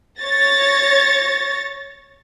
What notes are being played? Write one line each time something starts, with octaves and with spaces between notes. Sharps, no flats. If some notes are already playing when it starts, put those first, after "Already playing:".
C#5 A6 A#6